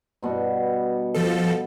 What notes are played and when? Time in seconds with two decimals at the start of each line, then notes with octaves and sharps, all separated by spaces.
0.23 G2 B2
1.14 F3 A4